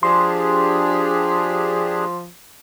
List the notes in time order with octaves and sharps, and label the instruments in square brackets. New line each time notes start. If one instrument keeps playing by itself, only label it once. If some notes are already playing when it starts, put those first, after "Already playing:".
[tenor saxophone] F3 [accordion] D4 G4 G#4 [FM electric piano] C6